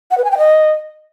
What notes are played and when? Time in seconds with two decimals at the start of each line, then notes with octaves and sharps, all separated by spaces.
0.11 F#5
0.18 B4
0.24 G#5
0.31 G5
0.38 D#5